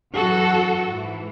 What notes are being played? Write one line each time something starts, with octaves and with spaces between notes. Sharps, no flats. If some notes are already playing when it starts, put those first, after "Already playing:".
F#2 E3 F#4 A4
G#2 E3